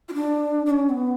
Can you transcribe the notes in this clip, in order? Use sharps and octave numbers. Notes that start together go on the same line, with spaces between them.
F4
D4
D4
C#4
B3